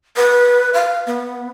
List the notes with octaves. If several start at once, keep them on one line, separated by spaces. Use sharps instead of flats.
B4
F5
B3